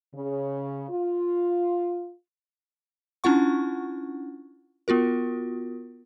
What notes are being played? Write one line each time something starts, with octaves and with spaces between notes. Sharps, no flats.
C#3
F4
C#4 D4 E4 F4 F#5 C#6
B3 F4 F#4 A#4